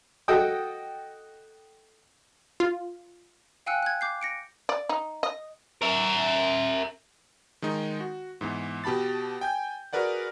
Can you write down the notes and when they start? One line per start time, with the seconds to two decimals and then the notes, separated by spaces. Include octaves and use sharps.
0.28 F#4 A4 D#5 G5 D#6
2.60 F4
3.66 F5 G5 G#5 E6 F#6 C#7
3.83 F#6 G#6
4.01 D6 G6 C7
4.21 A#6 C#7 D7
4.69 D5
4.89 D#4
5.23 D#5
5.82 A#4 E5
7.62 D#3 G#3 D#4
8.00 F#4
8.41 G#2 E3 B3
8.84 B2 G4 A5 B5 A6
9.41 G5 G#5 G6
9.93 F#4 G#4 A#4 B4 D5 F#5